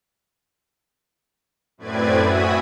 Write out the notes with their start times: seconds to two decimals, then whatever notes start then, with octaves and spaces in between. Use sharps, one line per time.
1.78 F#2 A2 C4 B4 D5 G#6
2.20 F#4 E5 G#5 B5 D#6